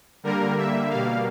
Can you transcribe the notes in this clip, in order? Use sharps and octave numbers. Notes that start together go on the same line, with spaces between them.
D3 G3 A#3 A#4
E5
B2 G3 A#3 F5